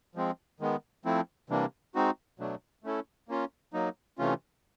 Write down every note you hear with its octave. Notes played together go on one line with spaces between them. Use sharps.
F3 G#3 C4
D#3 G#3 B3
F3 A3 C4 E4
C3 E3 G3 A#3 D4
G#3 C4 D#4 F#4
B2 F#3 A3 D4
A3 C#4 E4 A4
A#3 C#4 F4
F#3 A#3 D#4
C3 E3 A3 C#4 F4